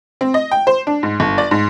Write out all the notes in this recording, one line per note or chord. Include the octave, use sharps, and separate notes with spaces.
C4
D#5
G5
C5
D4
G#2
G1
D5
G#2